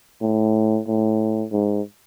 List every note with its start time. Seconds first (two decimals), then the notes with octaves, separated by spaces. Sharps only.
0.21 A2
0.87 A2
1.52 G#2